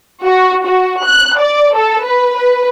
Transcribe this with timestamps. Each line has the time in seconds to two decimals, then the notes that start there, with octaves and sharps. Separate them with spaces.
0.24 F#4
0.65 F#4
1.04 F#6
1.39 D5
1.75 A4
2.04 B4
2.37 B4